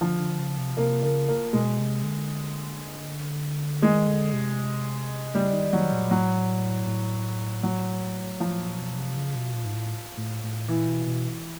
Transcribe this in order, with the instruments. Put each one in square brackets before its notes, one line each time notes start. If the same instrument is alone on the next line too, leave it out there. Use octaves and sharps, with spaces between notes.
[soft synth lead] D3 [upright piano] F3
[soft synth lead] D3
C#3
C3
[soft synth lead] C3 [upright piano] A#3
[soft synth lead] C#3 [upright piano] A#3
[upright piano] A#3
[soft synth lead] B2 [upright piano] G#3
[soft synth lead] C3
D3
[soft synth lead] D#3 [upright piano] G#3
[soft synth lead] D3
C3
[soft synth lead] C#3 [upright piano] G3
[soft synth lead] D#3
[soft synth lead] D#3 [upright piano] F#3
[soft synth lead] A#2
[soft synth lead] A2 [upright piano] F#3
[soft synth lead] A2
[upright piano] F#3
[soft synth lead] A2 [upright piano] F3
[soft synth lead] A#2
B2
C3
C#3
B2
A#2
G#2
A2
A2
A2
[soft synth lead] A#2 [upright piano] E3
[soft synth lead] B2
B2